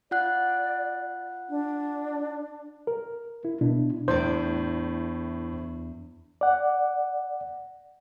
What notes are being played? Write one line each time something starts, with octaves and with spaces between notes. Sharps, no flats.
F4 D5 F#5 F#6
D4
A#4
E4
B2 D4 E4
E2 A2 D4 C5 D5
D5 F#5